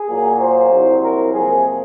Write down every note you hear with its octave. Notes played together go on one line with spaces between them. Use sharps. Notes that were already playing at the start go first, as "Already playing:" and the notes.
Already playing: G#4
A#2 F#3 A#3
C5
C2 C3 F#3
A#4
F2 C3 F3 A#3 G#4